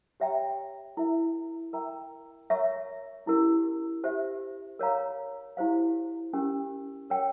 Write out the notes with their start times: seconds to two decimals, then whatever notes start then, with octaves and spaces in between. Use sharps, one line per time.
0.20 G4 C#5 E5 G5 A#5
0.97 E4 A#4 E5
1.73 A#4 E5 G5 A#5
2.50 A#4 C#5 E5 A#5 C#6
3.26 C#4 E4 G4 A#4
4.04 G4 C5 E5
4.79 A#4 C#5 F5 A#5
5.57 E4 G4 C5 F5
6.33 C#4 G4 A#4
7.10 A#4 C#5 G5